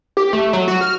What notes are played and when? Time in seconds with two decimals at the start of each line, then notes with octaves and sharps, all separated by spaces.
0.17 G4
0.33 A3
0.53 F#3
0.68 F#4
0.81 F6